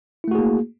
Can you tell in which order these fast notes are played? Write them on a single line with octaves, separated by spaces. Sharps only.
E4 A3 F#4 G#4 A#3